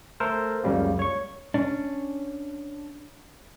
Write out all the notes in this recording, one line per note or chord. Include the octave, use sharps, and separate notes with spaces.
A3 A4 A#4 C5
C#2 F#2 C#3 G3 A#3
C#5 C#6
C#4 D4